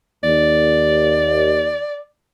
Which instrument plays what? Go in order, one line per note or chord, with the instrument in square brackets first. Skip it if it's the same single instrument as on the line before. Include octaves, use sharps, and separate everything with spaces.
[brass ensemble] D#2 [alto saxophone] D5